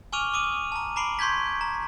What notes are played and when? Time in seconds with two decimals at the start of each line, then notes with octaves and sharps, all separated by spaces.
0.12 G#5 C#6 D6 F6 D#7 F7
0.34 D6 D#6 D#7 F#7
0.72 A5 A#5
0.96 A#5 B5 D6 C7 D7 F#7
1.19 C6 C#6 G6 G#6 B6
1.61 A#5